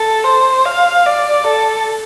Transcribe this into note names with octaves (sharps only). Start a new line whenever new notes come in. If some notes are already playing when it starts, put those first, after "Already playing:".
Already playing: A4
C5
F5
D5
A4